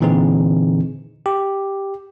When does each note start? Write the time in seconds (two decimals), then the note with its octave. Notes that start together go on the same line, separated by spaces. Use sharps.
0.01 A#2 D3 E3 C4 D#4 G#4
1.26 G4